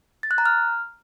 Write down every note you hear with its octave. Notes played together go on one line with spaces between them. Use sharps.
A6
F#6
A#5
F6